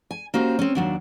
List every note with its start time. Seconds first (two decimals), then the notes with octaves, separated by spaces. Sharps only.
0.11 G#5
0.34 A#3 C#4 F#4 G4 C5
0.59 C4 C#4
0.75 D#2 F#3 D4